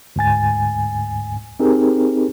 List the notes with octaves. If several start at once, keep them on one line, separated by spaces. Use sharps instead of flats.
D2 G#2 G#5 A6
C4 D#4 G4 G#4 A#4